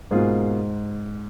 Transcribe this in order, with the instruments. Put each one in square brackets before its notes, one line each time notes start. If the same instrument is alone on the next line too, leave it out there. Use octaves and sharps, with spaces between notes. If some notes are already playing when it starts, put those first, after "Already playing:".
[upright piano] G#2 [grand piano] B2 A#3 F4 G#4